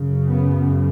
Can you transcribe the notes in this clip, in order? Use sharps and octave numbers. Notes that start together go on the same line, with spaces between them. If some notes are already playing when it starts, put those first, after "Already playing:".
Already playing: F#2 C#3
B3